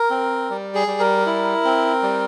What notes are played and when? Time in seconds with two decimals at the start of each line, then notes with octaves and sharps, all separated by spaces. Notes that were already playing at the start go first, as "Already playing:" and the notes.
Already playing: A#4
0.10 C4
0.50 G3
0.75 G#4
0.87 G3
1.00 A#4
1.26 E4
1.65 C4
2.03 G3